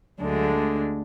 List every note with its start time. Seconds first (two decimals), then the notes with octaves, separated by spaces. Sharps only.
0.19 D2 D3 F#3 G#3 D4
0.56 A3